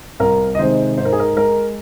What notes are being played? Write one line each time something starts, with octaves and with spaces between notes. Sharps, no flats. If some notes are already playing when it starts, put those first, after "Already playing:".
C2 A#4
D#5
C3 D#3 G#3 C5
G#2 C5
A#4
G#4
A#4
G#3 A#4